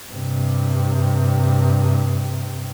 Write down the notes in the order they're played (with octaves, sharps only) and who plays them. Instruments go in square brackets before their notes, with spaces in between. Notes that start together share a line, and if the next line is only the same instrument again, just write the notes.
[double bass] G2 C3